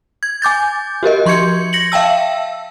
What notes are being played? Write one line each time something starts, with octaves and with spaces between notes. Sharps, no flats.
G#6
G#5 D6 G6 A6
F#4 G4 A#4 D#5
F3 C6 C#6 G6 G#6 C#7
A#6 C#7 F#7
E5 F5 G5 A5 E6